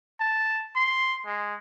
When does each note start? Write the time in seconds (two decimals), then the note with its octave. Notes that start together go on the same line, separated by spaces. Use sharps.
0.20 A5
0.75 C6
1.26 G#3